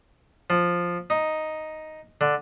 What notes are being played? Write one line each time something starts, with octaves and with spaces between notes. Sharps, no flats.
F3
D#4
D3